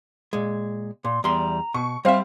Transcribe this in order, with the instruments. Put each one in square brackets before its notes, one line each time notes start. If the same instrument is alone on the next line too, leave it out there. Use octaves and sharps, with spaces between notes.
[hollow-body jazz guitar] A#2 G#3
[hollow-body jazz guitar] A#2 [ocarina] C6
[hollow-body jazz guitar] E2 G3 C6 [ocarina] A#5
[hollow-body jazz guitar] B2 [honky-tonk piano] C#6
[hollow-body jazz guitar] G3 E5 [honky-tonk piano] C4 F5 [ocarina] C6